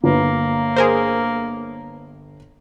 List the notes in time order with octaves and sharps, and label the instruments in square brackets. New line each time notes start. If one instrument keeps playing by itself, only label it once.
[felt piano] G1 B4 [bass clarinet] A#3
[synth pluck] G#4 A#4 C5